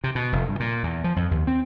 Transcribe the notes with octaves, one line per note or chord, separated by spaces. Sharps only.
C3
B2
F1
G2
A#2
E2
F3
F2
D#2
C4